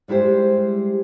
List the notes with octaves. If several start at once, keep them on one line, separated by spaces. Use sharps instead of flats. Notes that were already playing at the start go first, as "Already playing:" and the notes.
G3 G#3 E4 G4 C5